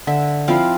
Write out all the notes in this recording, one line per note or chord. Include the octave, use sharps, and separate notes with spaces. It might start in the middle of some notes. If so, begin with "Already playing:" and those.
D3 E5
F3 C4 E4 F5